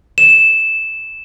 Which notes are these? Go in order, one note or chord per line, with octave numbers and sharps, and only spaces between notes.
E7